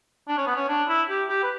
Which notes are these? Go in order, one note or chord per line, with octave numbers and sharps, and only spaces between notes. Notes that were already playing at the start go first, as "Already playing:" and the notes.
D4
C#4
B3
C#4
D4
E4
G4
G4
B4